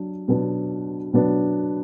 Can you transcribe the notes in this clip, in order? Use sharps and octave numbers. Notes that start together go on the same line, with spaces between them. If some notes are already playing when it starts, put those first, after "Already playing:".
Already playing: F#3 D4
B2 F#3 B3 D4
B2 F#3 B3 D4